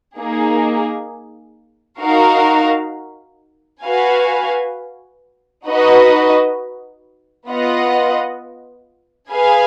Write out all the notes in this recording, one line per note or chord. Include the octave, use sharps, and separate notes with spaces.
A#3 D#4 G#4
D#4 F#4 A#4 F5
F#4 B4 F5 G#5
D#4 F#4 B4 D#5
B3 F4 B4 D#5 F#5
G#4 B4 F5 G#5